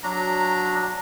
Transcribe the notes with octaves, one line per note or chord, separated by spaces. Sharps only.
F#3 D4 A#5